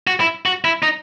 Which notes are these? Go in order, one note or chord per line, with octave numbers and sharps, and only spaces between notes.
F#4
E4
F#4
E4
D#4